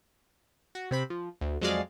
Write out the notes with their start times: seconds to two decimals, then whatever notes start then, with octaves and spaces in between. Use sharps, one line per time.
0.75 F#4
0.91 C3 C4 B5
1.10 F3
1.41 D2
1.61 F2 F#3 G#3 G#4 D5 F5